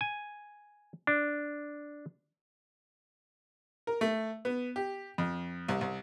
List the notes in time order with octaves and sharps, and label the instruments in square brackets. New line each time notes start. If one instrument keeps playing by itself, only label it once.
[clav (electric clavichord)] G#5
D4
[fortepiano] A#4
A3
B3
G4
F2
C2
C2